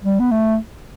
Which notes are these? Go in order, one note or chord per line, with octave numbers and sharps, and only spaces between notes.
G3
B3
A3